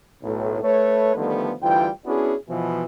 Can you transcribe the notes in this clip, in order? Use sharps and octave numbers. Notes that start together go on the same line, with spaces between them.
B1 A2
A3 B4 C#5
D3 D#3 F3 G3 A3 B3
D2 E3 G3 F4 G5
B3 C#4 D4 E4 F#4 G#4
B2 E3 F3